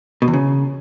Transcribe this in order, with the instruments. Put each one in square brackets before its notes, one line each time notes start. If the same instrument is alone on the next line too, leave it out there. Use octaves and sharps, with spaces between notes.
[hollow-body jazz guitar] B2
E2
C#3